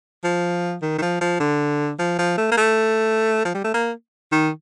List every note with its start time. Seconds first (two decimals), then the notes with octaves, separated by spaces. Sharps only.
0.24 F3
0.82 D#3
0.98 D#3
1.02 F3
1.21 F3
1.40 D3
1.99 F3
2.18 F3
2.38 A3
2.51 A#3
2.57 A3
3.45 F3
3.55 G3
3.64 A3
3.74 A#3
4.32 D#3